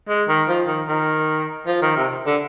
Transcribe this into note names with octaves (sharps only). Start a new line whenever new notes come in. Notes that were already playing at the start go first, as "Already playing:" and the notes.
G#3
D#3
F3
D#3
D#3
F3
D#3
C3
D3